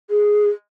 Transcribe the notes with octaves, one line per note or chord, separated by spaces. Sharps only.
G#4